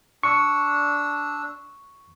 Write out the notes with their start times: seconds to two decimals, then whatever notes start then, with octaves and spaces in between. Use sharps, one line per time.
0.23 D4 C#6 E6